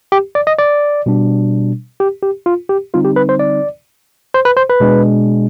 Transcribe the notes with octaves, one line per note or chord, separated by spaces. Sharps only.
G4
D5
D#5
D5
B2 G3 D4
G4
G4
F4
G4
D3 G3 C4 D#4 F4
G4
B4
C5
D5
C5
B4
C5
B4
B2 G#3 D4